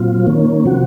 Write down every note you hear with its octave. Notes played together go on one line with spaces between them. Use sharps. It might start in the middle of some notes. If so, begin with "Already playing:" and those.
Already playing: A#2 F#3 C4 F4
D#3 A#3 C#4
C3 F3 C4 F#4